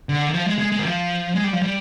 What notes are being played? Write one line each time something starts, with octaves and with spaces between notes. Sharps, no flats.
D3
D#3
F3
G#3
G#3
G#3
D#3
F3
G#3
G3
F3
G3